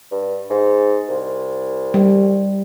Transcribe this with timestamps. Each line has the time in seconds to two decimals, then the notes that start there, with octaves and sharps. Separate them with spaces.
0.11 G2
0.50 G#2
1.09 C2
1.94 G3